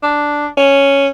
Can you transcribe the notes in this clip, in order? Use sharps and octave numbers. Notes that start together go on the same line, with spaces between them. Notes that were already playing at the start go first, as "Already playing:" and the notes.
D4
C#4